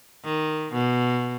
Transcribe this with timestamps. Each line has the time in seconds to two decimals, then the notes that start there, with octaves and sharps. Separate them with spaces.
0.24 D#3
0.73 B2